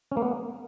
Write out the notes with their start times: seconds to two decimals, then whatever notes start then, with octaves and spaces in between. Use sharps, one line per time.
0.11 C#4
0.17 A#3
0.22 B3